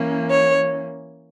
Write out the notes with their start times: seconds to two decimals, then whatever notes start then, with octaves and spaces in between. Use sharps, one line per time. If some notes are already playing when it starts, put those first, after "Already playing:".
Already playing: E3 A#3 C#4
0.30 C#5